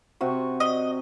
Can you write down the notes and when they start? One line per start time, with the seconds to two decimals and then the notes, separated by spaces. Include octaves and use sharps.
0.21 C3 F#4 C#6
0.60 D#5